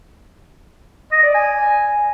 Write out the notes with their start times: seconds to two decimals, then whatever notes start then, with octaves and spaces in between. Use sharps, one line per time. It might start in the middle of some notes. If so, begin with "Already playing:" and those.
1.12 D#5
1.23 D5
1.34 G#5